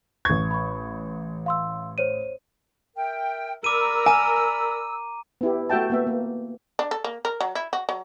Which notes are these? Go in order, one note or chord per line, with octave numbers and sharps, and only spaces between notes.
A1 C#6 G#6
B5 C#6
F5 C6 E6
C5 C#5 D#7
A#4 E5 G5
A#4 D5 B5 D6 E6 D#7
G#5 A#5 D#7
B3 E4 G4
A3 F#4 E5 G5 A5
A#3 B3 E5
A#3
D4
A4
A#3
A#4
F#3
E4
F#4
F#3